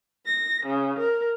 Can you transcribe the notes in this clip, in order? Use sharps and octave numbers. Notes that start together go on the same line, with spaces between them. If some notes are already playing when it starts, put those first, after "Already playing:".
A#6
C#3
A#4